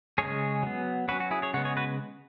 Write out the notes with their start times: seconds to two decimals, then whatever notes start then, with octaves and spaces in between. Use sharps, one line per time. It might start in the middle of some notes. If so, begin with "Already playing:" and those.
0.18 C#3 G#3 C#4 G#4 C#5
0.63 F#3 B3
1.08 F#3 C#4 F#4 B4
1.20 F#4
1.31 E4 G#4
1.42 G#4 C#5
1.54 C#3 G#3 B3 C#5 F#5
1.65 G#4 C#5
1.77 F#4 B4